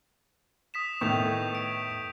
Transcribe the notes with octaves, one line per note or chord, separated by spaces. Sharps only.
D#6 B6 E7
A2 D#3 B3 C#6 G6 F7
D7